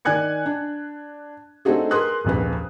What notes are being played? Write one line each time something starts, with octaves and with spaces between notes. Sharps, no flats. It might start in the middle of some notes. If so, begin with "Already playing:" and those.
D#3 D5 G#5 F#6 G#6 C#7
D4
A3 C4 D4 D#4 F#4 G#4
G#4 A#4 B4 C6 D#6 F#6
D#1 A#1 F2 B4